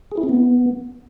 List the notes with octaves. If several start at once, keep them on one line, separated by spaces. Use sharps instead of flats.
G#4
E4
C4
B3